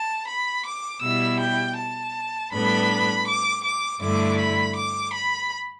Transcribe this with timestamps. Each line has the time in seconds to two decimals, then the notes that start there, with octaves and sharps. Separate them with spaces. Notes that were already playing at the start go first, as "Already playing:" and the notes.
Already playing: A5
0.29 B5
0.66 D6
1.03 B2 G3 E4 E6
1.40 G5
1.78 A5
2.53 A2 G3 B3 D4 B5
3.27 D6
3.64 D6
4.02 G2 D3 A3 E4 D6
4.39 B5
4.76 D6
5.14 B5